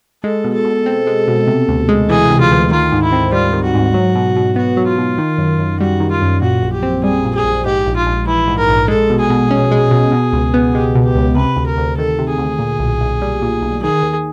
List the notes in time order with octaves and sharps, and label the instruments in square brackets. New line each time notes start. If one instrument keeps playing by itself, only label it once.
[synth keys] G#3 [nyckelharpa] A4
[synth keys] B2
[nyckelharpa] A4
[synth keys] B2
C4
G#3
B2
C3
D2
G#3
[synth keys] E3 [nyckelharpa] G#4
[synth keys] C3
[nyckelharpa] F4
[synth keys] D2
[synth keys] D#3 [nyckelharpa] F4
[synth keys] G#2
[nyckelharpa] E4
[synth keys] C4
[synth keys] G3 [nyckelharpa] F4
[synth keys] D#3
[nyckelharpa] F#4
[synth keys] G#2
F#3
B2
B2
[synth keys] B3 [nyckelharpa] F#4
[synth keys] F#3
[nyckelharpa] F4
[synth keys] B2
D#3
F#2
F#2
[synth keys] G3 [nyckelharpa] F#4
[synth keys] D#3
[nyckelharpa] F4
[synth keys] F#2
[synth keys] A#2 [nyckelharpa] F#4
[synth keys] A#1
[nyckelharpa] G4
[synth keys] C4
[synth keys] G3 [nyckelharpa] G#4
[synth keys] A#2
[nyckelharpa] G#4
[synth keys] A#1
[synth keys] G#2 [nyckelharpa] G4
[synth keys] A#1
[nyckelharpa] F4
[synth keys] A#1
[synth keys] E3 [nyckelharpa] E4
[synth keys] G#2
[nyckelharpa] A#4
[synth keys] A#1
[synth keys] G#3 [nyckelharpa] A4
[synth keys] B2
[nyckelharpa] G#4
[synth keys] B2
C#4
G#3
B2
B2
C#2
B3
[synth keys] G#3 [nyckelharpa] G4
[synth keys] B2
[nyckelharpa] G4
[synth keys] C#2
[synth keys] C3 [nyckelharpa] B4
[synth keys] D2
[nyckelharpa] A#4
[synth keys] D2
[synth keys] D#3 [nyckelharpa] A4
[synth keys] C3
[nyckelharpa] G#4
[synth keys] D2
A#2
B1
B1
G3
A#2
B1
[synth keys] D#3 [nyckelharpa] G#4
[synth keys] D#2